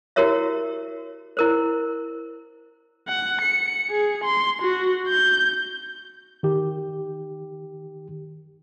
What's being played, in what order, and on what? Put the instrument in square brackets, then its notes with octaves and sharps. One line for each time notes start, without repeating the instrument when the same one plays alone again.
[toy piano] E4 F#4 G4 A#4 C#5 E5
E4 A#4 C5
[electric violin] F#5
C#7
G#4
C6
F#4
G6
[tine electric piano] D#3 G4